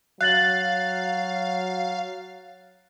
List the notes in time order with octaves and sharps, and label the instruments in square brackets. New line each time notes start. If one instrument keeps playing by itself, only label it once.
[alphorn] F#3 [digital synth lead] F5 [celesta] F#6 A6 F#7